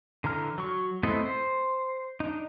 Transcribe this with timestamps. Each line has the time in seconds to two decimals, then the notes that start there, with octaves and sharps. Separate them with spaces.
0.24 D3 E3 A#5 F6
0.58 F#3 C#6
1.03 A3 B3 C4 E4 D#5
1.25 C5
2.20 D4 D#4